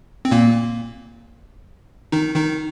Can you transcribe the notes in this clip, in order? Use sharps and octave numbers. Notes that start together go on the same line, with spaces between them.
C4
A#2 A#3
D#3 D#4
D#3 D#4